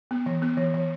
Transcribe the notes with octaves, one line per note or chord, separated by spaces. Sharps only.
B3
E3
B3
E3
E3